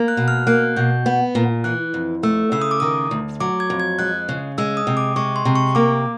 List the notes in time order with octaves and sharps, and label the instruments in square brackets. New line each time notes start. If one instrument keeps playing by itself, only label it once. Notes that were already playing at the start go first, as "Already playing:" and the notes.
Already playing: [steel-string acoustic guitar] A#3
[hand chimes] F#6
[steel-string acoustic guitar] B2
[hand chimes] F6
[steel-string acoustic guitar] A#3 [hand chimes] F#6
[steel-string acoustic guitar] B2 [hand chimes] G6
[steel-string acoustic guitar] B3
A#2
[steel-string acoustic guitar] E3 [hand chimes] F#6
[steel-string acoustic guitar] F2
[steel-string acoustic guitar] A3 [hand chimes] E6
[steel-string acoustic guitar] C#3 [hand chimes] E6
[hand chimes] D#6
D6
[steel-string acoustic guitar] D#3 [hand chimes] D#6
[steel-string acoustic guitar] D2
[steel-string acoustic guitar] F#3 [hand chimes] D6
[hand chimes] G#6
[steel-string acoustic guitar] F2
[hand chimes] G#6
[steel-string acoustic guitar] G#3 [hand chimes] F#6
[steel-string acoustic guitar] C#3
[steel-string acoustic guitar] G#3 [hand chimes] E6
[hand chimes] D#6
[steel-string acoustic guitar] C3
[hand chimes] D6
[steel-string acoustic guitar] G#3 [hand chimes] C#6
[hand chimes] C6
[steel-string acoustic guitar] C3
[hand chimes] C#6
[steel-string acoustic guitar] A#3 [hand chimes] D6